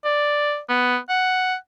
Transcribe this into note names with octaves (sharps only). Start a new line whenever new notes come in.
D5
B3
F#5